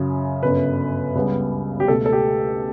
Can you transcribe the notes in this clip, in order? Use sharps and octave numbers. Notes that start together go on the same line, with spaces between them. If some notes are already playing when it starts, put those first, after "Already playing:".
Already playing: F#2 C#3 F#3
G1 F#2 C#3 B4
C#2 C#3 G3 B3
G4
C#2 B2 A3 A4
A4
G4